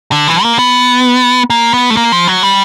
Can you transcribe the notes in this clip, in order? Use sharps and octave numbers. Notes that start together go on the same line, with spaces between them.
D3
E3
A#3
B3
A#3
B3
A3
A#3
F3
F#3
G3